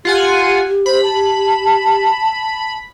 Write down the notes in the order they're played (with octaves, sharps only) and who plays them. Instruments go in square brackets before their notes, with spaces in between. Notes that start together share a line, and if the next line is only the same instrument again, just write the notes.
[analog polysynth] F4 F#5 G#5 [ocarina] G4
[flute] C5 [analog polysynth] B5
[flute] A5